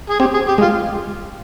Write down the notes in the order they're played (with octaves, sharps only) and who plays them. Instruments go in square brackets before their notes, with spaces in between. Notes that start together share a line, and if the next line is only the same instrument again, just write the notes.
[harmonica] G#4
[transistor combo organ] C4 [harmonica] G4
[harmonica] G#4
G4
[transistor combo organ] G#3
[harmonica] F4